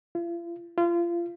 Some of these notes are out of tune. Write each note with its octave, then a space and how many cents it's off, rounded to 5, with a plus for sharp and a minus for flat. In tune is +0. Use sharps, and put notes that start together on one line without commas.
F4 -45
F4 -30